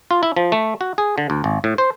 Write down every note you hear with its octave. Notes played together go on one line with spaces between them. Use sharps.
F4
E4
F3
A3
F#4
G#4
D3
D2
G#1
A2
C5